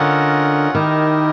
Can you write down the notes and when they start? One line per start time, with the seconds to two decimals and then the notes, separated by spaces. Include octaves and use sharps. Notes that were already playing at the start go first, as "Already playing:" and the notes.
Already playing: D3 C#4 F4 A#4 D#5 F#5
0.74 D#3 E4 G4 A#4 D#5